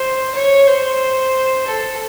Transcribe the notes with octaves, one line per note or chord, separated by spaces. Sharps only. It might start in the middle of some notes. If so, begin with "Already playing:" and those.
Already playing: C5
C#5
C5
A4